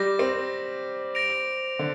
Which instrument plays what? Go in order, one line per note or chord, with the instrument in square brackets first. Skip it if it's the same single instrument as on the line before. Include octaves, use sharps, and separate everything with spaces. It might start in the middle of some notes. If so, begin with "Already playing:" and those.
Already playing: [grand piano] G3 [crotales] D6 G6 A#6
[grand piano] C4
[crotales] A#6 D7 F7
[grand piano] D3